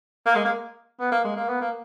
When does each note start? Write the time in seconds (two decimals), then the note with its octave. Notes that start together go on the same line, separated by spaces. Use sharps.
0.26 A#3
0.35 G#3
0.45 A#3
1.00 B3
1.12 A#3
1.24 G#3
1.36 A#3
1.48 B3
1.61 A#3